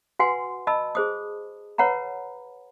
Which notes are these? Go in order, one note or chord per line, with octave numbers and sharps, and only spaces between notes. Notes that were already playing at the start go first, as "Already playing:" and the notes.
F#4 B4 F#5 G#5 C6
D#5 A5 B5 E6
G#4 C5 D#6
B4 C#5 F#5 A#5 B5